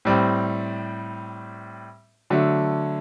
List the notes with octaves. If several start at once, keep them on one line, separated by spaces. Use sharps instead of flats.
A2 G3 C4
D3 F#3 A3